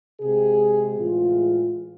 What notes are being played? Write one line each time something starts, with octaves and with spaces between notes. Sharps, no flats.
C3 G#3 G#4
A2 E3 G#3 F4